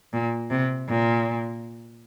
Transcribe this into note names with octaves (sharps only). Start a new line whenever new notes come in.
A#2
C3
A#2